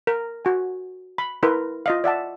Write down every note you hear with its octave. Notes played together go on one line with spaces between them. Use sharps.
A#4
F#4 G#5
B5
E4 A#4 B4 C6
F4 D#5 F5
D5 E5 F#5 A5